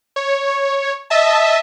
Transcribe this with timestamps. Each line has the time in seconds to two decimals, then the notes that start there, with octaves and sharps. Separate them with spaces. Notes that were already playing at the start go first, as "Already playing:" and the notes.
0.16 C#5
1.10 D#5 E5 A5